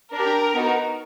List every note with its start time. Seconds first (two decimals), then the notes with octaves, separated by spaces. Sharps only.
0.13 D4 G4 A#4
0.54 B3 D#4 F#4